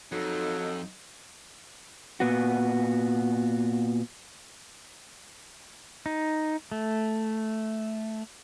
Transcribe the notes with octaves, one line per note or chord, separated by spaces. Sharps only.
F2 F#3 D#4 A4
A#2 B3 F#4
D#4
A3